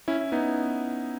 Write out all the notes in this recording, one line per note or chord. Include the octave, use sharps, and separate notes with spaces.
C#4 E4
B3 D#4